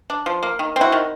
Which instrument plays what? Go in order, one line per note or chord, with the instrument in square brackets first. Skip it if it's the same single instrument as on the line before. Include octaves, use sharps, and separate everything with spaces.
[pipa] D4
F3
A#3
D#3
C4
E4 F#4
D#3